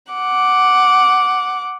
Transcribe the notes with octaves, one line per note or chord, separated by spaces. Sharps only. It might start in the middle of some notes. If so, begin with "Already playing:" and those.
F#5 D6